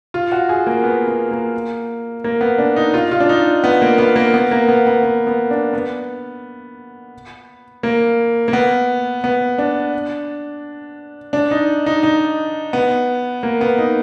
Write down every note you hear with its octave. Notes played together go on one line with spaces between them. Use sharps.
F4
F#4
G#4
A#3
B3
B3
A#3
A#3
B3
D4
D#4
F4
F4
D4
D#4
B3
A#3
B3
A#3
B3
A#3
B3
B3
B3
B3
D4
B3
A#3
A#3
B3
B3
D4
D4
D#4
D#4
D#4
B3
A#3
B3
D#4